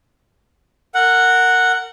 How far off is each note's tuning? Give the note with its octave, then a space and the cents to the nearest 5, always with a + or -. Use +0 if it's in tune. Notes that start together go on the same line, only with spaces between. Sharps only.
A#4 -25 F#5 +0